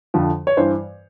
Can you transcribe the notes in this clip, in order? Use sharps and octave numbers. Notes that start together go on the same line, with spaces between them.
F2 D3 F3
C#5
G2 E3 C5